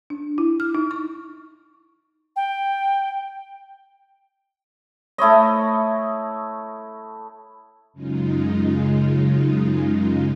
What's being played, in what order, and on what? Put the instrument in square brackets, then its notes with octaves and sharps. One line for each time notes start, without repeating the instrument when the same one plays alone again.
[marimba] D4
E4
F6
D#4
C#6
[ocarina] G5
[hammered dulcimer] A3 E4 C#5 D#5
[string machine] F#2 C#3 G#3 D#4 F4